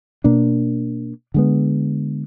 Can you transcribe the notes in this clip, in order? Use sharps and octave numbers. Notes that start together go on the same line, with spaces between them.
B2 A#3 D4
D3 G#3 B3